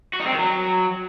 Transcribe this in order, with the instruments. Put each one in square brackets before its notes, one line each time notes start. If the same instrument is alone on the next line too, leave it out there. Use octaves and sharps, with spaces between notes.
[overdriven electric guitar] F#4
D#4
C4
D#3
F#3